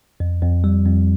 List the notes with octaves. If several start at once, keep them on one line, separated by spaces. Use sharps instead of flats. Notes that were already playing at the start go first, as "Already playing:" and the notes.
F2
F2
G3
F2